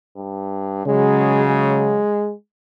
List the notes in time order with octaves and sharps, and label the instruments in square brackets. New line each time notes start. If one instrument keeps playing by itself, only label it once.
[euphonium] G2
[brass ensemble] C#3 F#3 [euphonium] G#3
[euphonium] G#3